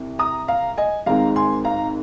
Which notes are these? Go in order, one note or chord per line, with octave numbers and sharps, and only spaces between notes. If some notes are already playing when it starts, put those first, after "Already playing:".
Already playing: C2 C3
A#5 D#6
F5 A#5
D#5 G#5
G#1 G#2 G#3 C4 F5 A#5
G#5 C6
F5 A#5